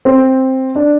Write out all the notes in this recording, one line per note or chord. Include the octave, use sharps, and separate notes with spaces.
C4
D4